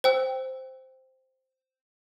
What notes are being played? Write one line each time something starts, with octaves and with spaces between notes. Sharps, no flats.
C5 G5 E6